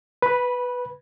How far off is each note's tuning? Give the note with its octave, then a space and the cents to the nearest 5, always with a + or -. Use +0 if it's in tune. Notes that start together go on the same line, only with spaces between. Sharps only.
B4 +0 B5 -15